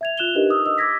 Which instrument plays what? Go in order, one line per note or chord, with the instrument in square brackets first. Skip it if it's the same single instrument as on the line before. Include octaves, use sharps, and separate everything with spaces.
[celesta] E5 G#6 F7
F4 F#6 E7 F7 G7
D4 D#4 G4 A#4 B4 D#5
D#6 E6
D#5 D#6 E6
D6 E6 G#6 A#6 B6